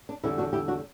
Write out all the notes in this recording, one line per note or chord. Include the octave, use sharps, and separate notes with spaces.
D4
E2 D3 G3 E4
D4 F#4
E4 G4
D4 F#4